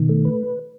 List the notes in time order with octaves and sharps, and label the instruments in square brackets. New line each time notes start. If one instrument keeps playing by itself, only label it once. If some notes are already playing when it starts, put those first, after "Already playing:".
Already playing: [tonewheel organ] B2 [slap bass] D#3
[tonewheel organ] A3
B4